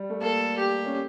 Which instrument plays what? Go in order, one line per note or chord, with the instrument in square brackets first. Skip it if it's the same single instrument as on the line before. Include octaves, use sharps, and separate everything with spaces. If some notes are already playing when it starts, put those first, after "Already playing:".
Already playing: [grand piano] G3
A3
[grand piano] A#3 [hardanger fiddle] A4
[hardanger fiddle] G4
[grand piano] C#4